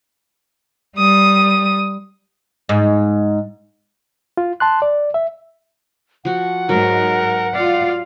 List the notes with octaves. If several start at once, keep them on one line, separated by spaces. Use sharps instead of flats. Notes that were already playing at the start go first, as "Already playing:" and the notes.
G3 D#6
G#2
F4
A5 C6 F#6
D5
E5
F3 F#4 F#5
G#2 F#3 A#4
F4 D5 F5